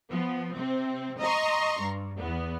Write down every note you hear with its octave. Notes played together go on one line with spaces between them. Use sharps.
F3 B3
C3 C4
D#5 A#5 C6 C#6
G2
E2 B3